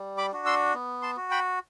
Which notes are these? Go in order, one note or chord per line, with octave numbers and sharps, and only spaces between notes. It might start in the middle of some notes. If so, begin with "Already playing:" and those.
Already playing: G3
B5 D6
D4 F#4
C6 E6
B3
A5 C6
F#4
G5 B5